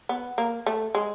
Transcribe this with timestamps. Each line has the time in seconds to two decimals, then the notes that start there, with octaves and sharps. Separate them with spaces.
0.09 B3
0.38 A#3
0.66 A3
0.95 G#3